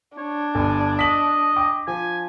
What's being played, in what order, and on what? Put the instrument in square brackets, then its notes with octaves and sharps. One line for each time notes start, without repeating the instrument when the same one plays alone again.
[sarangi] D4 [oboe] C#5
[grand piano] G1 [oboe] G#5
[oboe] D#5 [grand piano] B6 F#7
[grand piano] G5 D6
[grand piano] F3 [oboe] G#5